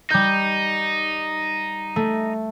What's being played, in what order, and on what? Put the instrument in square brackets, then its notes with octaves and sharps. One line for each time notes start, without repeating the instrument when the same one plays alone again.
[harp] G3 G6 [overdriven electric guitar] D#4
[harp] A3